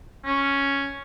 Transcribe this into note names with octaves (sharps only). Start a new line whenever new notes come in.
C#4